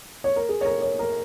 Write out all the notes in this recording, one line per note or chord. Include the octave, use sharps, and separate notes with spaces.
C#5
A#4
G#4
C#5
A#4
C#5
A#4